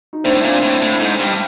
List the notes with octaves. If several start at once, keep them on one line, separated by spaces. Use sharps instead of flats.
D#4
A2 C4 D4
A#2
A2
A2
G#2
G2